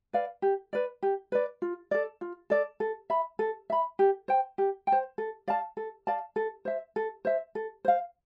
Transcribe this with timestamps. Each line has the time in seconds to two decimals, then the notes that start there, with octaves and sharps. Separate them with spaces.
0.13 B4 D5 F5
0.42 G4
0.73 B4 D5
1.03 G4
1.32 B4 D5
1.62 F4
1.91 A4 D5
2.21 F4
2.50 A4 D5
2.80 A4
3.10 E5 B5
3.39 A4
3.70 E5 B5
3.99 G4
4.28 C5 G5
4.58 G4
4.87 G5
4.92 C5
5.18 A4
5.48 D5 F5 A5
5.77 A4
6.07 D5 F5 A5
6.36 A4
6.65 C5 E5
6.96 A4
7.25 C5 E5
7.55 A4
7.85 C5 F5